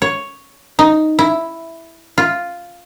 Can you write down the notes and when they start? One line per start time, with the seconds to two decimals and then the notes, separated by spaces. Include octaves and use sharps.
0.02 C#5
0.79 D#4
1.19 E4
2.18 F4